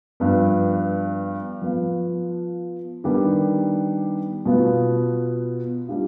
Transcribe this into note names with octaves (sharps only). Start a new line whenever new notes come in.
G2 F3 B3
F3 B3 F4
D#3 G3 B3 D4 G4
B2 B3 F4
G3 D4 F4